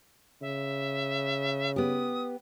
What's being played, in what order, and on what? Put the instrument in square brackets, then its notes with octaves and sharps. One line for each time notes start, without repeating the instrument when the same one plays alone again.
[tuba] C#3 [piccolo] E5
[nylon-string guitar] B3 G4 [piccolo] D#6